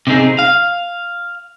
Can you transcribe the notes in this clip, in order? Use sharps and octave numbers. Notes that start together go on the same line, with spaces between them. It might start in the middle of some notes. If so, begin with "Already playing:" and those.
C3 C4 D#4 G#4
F5